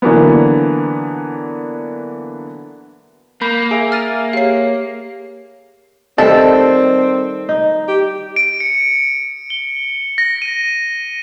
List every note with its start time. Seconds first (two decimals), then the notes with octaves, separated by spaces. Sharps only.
0.02 D3 E3 F#3 A#3 B3
3.42 A#3 B5 G6
3.71 G#4 E5 D7
3.92 F6 A6 D#7
4.33 G4 C#5 F5 C7
6.18 D#3 G3 A3 C4 A4
7.49 D#4
7.88 G4
8.36 D7
8.60 C#7
9.50 G7
10.18 A#6
10.42 D#7